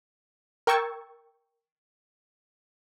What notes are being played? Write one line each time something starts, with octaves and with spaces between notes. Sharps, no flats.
A#4 G5 C#6 E6 G#6 A6